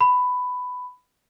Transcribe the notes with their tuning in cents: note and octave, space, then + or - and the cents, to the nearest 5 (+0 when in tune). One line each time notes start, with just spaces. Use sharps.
B5 +15